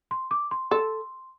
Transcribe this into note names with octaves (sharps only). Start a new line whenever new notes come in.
C6
D6
C6
A4 C6